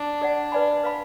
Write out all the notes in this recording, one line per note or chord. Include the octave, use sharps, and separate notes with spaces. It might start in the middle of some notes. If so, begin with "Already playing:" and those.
Already playing: D4
G#4 D5 F#5
B4 D5 G#5 B5
B4 F5 B5